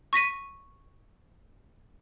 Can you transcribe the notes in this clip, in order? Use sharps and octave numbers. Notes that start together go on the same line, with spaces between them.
C#6 A#6 B6 D#7